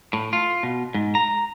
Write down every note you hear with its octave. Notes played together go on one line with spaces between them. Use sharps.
A2
F4
B2
G#2
A#5